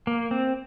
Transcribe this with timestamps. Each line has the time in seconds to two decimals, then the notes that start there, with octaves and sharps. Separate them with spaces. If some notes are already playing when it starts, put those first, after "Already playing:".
0.07 A#3
0.31 C4